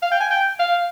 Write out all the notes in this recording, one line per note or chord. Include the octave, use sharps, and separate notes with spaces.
F5
G5
G#5
G5
F5